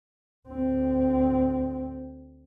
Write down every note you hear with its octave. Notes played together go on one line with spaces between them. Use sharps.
D2 C4